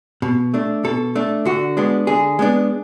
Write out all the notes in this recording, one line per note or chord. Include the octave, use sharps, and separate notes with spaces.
B2
A3 D4
B2 A4
A3 D4
D3 F#4
G#3 B3 D4
D3 G#4
G#3 B3 D4